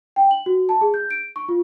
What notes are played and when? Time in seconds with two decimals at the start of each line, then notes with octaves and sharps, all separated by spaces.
0.16 G5
0.31 F#7
0.46 F#4
0.69 A5
0.81 G#4
0.94 G6
1.11 D7
1.36 C#6
1.49 F4